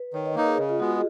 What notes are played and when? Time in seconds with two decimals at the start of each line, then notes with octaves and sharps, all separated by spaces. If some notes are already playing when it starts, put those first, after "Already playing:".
Already playing: B4
0.14 D#3 C#5
0.26 D#5
0.35 A#3 D#4 A#4
0.47 G#4
0.58 C#3 D#5
0.69 F4
0.80 G#3 B3 F#4
0.91 G#4